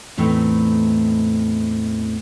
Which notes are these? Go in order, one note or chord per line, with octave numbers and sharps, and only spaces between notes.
E2 A2 A3 C4 D#4